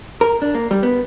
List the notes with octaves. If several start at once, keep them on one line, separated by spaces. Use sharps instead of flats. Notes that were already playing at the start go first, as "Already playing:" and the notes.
A#4
D4
A#3
G3
B3